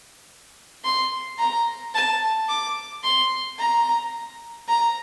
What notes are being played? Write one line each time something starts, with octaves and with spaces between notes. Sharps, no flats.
C6
A#5
A5
D6
C6
A#5
A#5